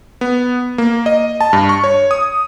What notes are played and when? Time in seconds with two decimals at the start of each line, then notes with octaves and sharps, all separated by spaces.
0.21 B3
0.78 A#3
1.06 D#5
1.41 A5
1.53 G2
1.69 C#6
1.84 C#5
2.11 D#6